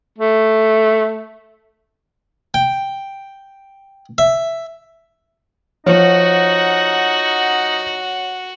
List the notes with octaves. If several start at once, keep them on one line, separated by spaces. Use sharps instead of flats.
A3
G5
E5
F3 D#4 F#4 C#5 F#5